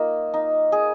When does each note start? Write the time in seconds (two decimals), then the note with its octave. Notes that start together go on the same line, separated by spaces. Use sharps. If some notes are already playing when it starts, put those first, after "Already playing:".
Already playing: A#3 D#4 F4
0.34 D#4
0.72 G#4